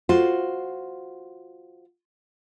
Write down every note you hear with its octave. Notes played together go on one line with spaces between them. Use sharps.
F4 F#4 C5